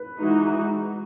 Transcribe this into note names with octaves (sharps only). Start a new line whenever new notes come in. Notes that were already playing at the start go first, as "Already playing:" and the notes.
Already playing: B4
E3 G#3 D#4 F#4